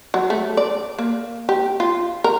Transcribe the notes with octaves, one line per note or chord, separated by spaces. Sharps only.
F#3
A3
D5
A#3
G4
F4
A#4